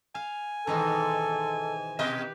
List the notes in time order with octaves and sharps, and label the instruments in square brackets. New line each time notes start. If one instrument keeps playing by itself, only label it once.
[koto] F5 [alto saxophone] G#5
[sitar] G#2 [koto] B2 D#3 E3 [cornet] A4
[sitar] B2 D#5 [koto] G4 B4